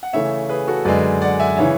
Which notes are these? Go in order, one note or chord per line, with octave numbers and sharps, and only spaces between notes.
F#5
C#3 E3 A3 C#5 E5
G#4 B4
F#4 A4
F#2 D3 G#3 B4 D5
D5 F#5
E5 G#5
C#3 E3 C#5 E5